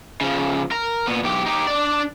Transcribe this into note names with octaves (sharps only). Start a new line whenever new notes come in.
C#3 F3
A#4
A#2 B3
B1 G4
D#4 G4
D4 D5